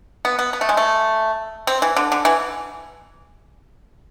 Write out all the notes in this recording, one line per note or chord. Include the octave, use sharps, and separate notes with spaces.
B3
B3
B3
A3
G#3
A3
C4
E3
D3
D3
E3